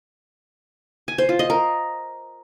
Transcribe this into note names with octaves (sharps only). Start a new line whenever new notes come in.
G#5
C5
F4
D#5
A#4